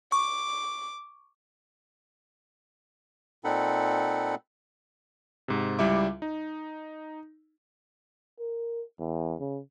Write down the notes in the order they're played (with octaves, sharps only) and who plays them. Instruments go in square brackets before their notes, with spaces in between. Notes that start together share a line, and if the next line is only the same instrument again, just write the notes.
[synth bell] C#6 [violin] D6
[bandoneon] A#2 C4 D#4 A4 F#5 B5
[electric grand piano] G#2 C3
C#2 G3 E4 E5 D6
D#4
[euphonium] A#4
E2
C#3